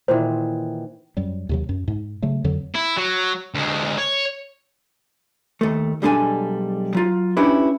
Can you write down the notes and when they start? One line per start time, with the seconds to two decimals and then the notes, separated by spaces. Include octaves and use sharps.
0.08 A#2 D#3 E3 C5
1.17 F#2 F#3 G3
1.49 D#2 C3 F#3
1.69 F#2
1.88 G#2
2.22 C#3 F#3 A3
2.44 F2 D3 F#3
2.75 E4
2.97 F#3
3.55 D2 G#3
3.98 C#5
5.61 D#2 A3
6.02 B1 G3 G#3 D4 A4 G#5
6.95 F#3 F4
7.37 C#4 D4 E4 G4 B4